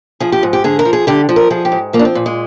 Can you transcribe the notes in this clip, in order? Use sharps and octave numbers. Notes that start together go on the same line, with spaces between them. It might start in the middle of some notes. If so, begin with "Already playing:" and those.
F3 G#4
G4
G#2
G4
D3 G#4
A#4
F3
G#4
D3 G4
F3
A#4
F3 G#4
G4
G#2
F3 A#3
D4
C4
A#2
G#3